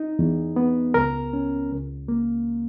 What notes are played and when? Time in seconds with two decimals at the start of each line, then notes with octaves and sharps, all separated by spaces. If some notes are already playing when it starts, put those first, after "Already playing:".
Already playing: D#4
0.19 E2
0.56 B3
0.94 C#2 A#4
1.33 C#4
1.71 C#2
2.08 A#3